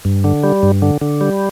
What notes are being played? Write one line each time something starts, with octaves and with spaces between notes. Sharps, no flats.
G2
D3
G3
G2
D3
D3
G3